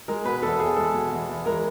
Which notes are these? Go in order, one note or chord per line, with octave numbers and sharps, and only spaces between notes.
G#3 A#4
B2 B4
E2 A4
E2 G#4
G#3 A4
B2
E2
E2
G#3 A#4